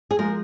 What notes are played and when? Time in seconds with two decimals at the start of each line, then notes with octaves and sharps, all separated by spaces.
0.11 G#4
0.19 F3 G#3 A#4